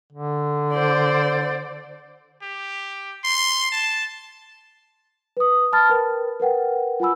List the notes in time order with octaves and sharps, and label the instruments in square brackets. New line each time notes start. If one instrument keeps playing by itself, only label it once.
[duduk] D3
[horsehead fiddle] C5 D5
[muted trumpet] G4
C6
A5
[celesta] B4 D#6
A5 B5 F6 A6
A#4 B4 G5
A#4 B4 F#5 G5
F4 F#5 G#5 B5 E6